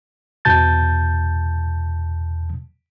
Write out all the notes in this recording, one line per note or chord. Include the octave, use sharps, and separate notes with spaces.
E2 B2 A5 G6 A6